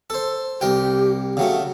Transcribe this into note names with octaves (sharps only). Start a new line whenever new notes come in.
A4 C5
C2 G4 A#4 G5
C#3 F#3 A3 G5